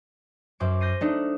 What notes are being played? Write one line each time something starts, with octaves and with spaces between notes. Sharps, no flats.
F#2 C5 D6 D7
G6 A#6 C7 D#7
A3 D4 D#4